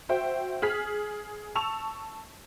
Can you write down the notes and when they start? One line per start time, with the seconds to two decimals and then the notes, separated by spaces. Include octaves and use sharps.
0.09 F#4 C5 E5 G5
0.62 G#4 F6 B6
1.55 A5 C#6 E6 F7